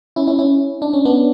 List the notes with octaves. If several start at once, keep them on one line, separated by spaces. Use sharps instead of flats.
C#4 E4
C#4 E4
C#4 E4
D4
C#4
B3 D4